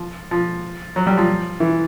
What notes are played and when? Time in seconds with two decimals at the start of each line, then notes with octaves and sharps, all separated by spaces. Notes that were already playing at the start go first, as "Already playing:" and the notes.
Already playing: F3
0.31 F3
0.96 F#3
1.07 G3
1.17 F3
1.60 E3